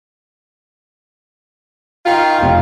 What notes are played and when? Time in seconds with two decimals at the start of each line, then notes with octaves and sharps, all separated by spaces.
2.06 D#3 F4
2.38 F1 G5